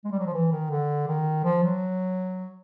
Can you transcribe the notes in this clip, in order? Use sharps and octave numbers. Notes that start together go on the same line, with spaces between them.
G#3
G3
F#3
F3
E3
D#3
D3
D#3
F3
F#3